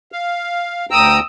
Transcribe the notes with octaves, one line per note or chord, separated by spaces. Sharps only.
F5
D2 G5 A#5 D#6 E6